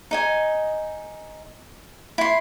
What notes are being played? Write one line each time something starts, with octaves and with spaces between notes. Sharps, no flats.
D#4 D#5 G#5
E4 C6